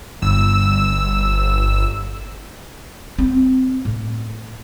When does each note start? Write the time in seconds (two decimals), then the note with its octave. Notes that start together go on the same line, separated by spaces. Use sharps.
0.22 G1 E6
3.18 C4
3.85 A2